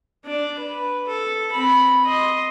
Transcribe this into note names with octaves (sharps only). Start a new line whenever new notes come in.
D4 D5
B4
A4
C4 B5
D#5 C6